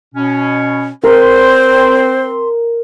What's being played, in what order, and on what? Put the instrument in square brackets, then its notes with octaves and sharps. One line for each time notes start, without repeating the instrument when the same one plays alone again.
[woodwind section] B2 C#4
[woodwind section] C4 C6 [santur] A#4 [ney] C5